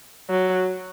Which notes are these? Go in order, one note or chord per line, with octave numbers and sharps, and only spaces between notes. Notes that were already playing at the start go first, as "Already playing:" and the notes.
F#3